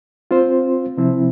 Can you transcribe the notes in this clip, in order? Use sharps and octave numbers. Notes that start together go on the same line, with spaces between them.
C4 F4 C5
C3 F3 C4 E4